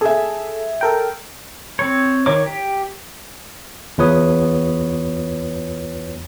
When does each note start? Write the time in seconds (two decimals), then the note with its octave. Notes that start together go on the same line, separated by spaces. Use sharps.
0.01 G#4 A4 E5
0.81 A4 A#4 G5
1.79 C4 C#5
2.26 D#3 C#5 D6
2.46 G4
3.98 E2 F4 B4 C#5 D#6